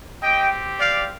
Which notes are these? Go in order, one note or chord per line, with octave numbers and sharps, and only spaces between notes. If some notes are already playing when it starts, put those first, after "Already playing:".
C4 G4 D#5 G5
D5 F5